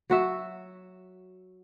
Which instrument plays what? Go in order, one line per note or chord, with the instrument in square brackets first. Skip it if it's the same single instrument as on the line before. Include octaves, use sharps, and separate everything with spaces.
[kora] F#3 F#4 E5